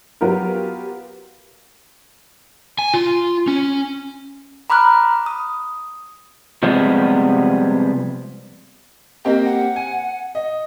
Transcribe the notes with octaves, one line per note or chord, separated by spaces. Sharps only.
F#3 B3 F4 G4 A#4
G#5
F4
C#4
A#5 B5 D6 F6 F#6
D#6
C3 F3 G3 G#3 B3
A#3 C4 G4 D#5
F#5
G#5
D#5